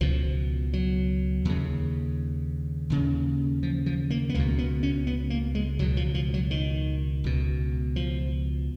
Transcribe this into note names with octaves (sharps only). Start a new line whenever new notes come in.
C#2 B2 F3
F#3
D#2 C#3
D#2 C#3
F3
F3
A#3
B3
C#2 B2 A#3
B3
C#4
B3
A#3
G#3
C#2 B2 F#3
F3
F3
F#3
D#3
C#2 B2
F3